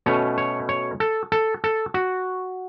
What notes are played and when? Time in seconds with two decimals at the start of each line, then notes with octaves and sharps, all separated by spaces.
0.06 B2 A3 C#4 C#5
0.38 C#5
0.69 C#5
1.00 A4
1.32 A4
1.64 A4
1.94 F#4